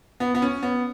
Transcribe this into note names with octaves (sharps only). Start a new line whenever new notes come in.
B3
B3
C#4
B3